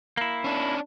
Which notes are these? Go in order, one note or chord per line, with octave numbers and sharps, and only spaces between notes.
A#3 E4
C#4 D4